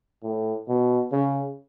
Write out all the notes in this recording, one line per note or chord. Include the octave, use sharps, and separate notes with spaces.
A2
B2
C#3